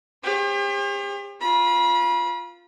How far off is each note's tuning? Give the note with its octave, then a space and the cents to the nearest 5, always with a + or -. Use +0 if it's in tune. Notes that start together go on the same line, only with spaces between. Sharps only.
G4 +40 C5 +45
F4 +0 B5 -35